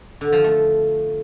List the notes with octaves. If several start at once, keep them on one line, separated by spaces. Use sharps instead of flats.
D3
F3
A3